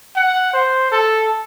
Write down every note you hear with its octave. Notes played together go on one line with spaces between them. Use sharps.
F#5
C5
A4